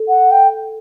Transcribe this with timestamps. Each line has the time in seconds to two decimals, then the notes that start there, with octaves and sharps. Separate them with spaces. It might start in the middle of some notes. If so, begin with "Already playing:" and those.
Already playing: A4
0.09 F#5
0.31 G5